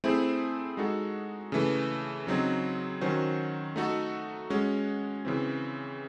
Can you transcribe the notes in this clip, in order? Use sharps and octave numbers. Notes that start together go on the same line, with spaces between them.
A3 C4 E4 G#4 C5
G#3 D#4 F#4 A4
C#3 E3 A3
C#3 F#3 C4 D#4
D#3 F#3 C#4 F#4 C5
A3 D#4 F#4 A4
G#3 C#4 F#4
C#3 E3 C4